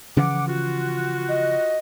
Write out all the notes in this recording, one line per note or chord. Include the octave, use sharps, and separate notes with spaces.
C#3 E3 F3 F#5 D6
F4 F#4
D#5